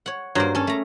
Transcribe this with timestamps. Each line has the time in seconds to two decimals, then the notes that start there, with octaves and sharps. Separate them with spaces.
0.06 C#5 F#5
0.35 G2 F#3 A#3 C5
0.55 C#4 A4 G#5
0.67 A3 A#5